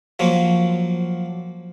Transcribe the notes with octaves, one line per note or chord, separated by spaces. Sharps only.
F3 F#3 A#3